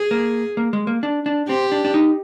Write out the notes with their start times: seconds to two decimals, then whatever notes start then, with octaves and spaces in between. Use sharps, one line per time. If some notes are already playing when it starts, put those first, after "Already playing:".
Already playing: G#4
0.11 A#3
0.57 A#3
0.73 G#3
0.87 A#3
1.03 D4
1.26 D4
1.48 C4 G4
1.72 D4
1.85 D4
1.94 D#4